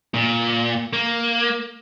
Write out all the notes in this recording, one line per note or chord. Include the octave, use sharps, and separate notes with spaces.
A#2
A#3